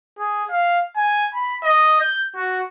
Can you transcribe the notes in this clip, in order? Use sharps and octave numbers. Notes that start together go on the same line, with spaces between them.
G#4
F5
G#5
B5
D#5
G6
F#4